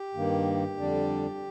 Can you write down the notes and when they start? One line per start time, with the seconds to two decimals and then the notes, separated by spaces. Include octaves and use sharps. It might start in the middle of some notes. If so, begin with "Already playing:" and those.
Already playing: G4
0.14 G2 D#3 A#3
0.77 F2 D3 G3 D4